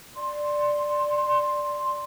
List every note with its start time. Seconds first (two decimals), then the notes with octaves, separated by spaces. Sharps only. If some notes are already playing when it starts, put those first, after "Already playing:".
0.16 D5 C6